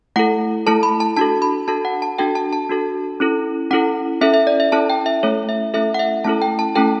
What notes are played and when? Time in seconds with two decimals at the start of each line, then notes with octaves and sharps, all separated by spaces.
0.16 A3 E4 A4 F#5
0.67 A3 E4 A4 A5
0.83 B5
1.00 A5
1.17 D4 F#4 A4 A5
1.42 B5
1.68 D4 F#4 A4 A5
1.85 F#5
2.02 A5
2.18 D4 F#4 A4 G5
2.35 A5
2.53 A5
2.69 D4 F#4 A4
3.20 C#4 E4 A4
3.71 C#4 E4 A4 F#5
4.21 C#4 E4 A4 E5
4.34 E5
4.47 D5
4.60 E5
4.72 C#4 E4 A4 A5
4.90 G5
5.06 E5
5.23 A3 C#4 E4 A4 C#5
5.49 E5
5.74 A3 C#4 E4 A4 E5
5.94 F#5
5.99 E5
6.24 A3 C#4 E4 A4 A5
6.42 G5
6.59 A5
6.75 A3 C#4 E4 A4 G5